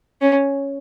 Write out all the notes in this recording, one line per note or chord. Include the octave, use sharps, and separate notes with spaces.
C#4